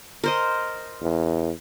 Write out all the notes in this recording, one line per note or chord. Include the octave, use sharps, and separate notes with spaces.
A#4 C5 D#5
E2